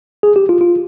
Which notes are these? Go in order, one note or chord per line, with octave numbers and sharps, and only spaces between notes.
G#4
G4
F4
F4